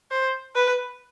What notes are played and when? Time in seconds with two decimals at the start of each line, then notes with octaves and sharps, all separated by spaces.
0.11 C5
0.56 B4